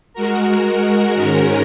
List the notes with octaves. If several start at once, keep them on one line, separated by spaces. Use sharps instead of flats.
G#3 F#4 A#4
G#2 D#3 G#3 C#4 A#4